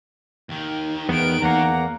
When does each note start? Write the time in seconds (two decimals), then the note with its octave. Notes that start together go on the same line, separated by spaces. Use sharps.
0.49 D#2 D#3
1.09 E2 D#3 B3 B4 D7
1.42 E2 A#3 F#5 A#5